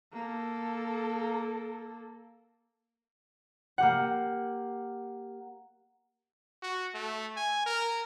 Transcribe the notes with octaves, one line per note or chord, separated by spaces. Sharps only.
A#3 A4
A#3 G4 F#5
F#4
A3
G#5
A#4